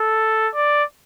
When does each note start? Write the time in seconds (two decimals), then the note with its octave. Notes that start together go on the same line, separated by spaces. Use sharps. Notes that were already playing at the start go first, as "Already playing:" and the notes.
Already playing: A4
0.55 D5